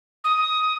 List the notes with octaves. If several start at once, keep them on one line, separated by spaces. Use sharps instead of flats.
D#6